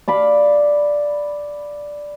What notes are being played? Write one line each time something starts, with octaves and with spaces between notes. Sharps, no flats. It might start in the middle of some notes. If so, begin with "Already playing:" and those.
D5 F5 B5